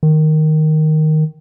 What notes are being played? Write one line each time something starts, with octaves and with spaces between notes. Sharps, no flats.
D#3